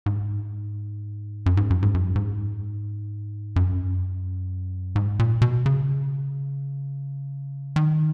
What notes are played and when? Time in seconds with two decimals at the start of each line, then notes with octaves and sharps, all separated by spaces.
0.06 G#2
1.46 F#2
1.57 G#2
1.70 F#2
1.82 G#2
1.94 F#2
2.16 G#2
3.56 F#2
4.96 G#2
5.19 A#2
5.41 B2
5.66 C#3
7.76 D#3